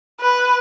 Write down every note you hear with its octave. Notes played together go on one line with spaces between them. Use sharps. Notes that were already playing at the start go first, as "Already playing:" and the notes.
B4